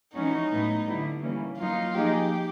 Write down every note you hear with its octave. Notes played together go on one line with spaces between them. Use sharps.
E3 G#3 C#4 D#4 F#4
A2 F#3 B3 E4
D3 G3 B3 E4
E3 G3 A#3 C#4
F#3 A#3 D#4 F4
F3 A#3 D#4 G4 G#4